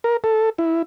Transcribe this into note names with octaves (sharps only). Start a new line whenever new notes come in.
A#4
A4
E4